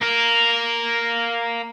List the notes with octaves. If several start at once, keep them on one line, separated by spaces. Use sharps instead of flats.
A#3 A#4